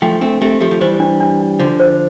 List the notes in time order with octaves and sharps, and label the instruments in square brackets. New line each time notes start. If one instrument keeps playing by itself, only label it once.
[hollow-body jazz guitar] F3 A3 [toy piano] G5
[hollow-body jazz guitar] A3 C4 [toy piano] D4
[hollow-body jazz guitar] A3 C4 [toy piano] G4
[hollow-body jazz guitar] F3 A3 [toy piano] G4
[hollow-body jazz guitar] F3
[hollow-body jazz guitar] E3 G3 [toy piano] C5
[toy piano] D4
D4
D4
[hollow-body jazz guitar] D3 F3 [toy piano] C5
[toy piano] C5